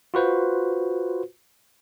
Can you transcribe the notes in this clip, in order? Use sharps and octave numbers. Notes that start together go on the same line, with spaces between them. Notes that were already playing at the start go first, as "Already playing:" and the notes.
F4 F#4 B4 C5